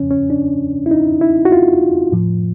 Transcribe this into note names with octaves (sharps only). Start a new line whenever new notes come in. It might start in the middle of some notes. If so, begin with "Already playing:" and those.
Already playing: E2 C#3 F3 C#4
C#4
D4
E4
D#4
E4
F#4
F4
A2 F3